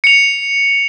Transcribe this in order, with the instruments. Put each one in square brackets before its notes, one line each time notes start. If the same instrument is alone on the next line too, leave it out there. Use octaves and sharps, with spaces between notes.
[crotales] C#7 F7